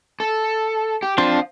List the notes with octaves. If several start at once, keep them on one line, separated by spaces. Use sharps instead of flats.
A4
G4
C4 D4 F4 C5 F5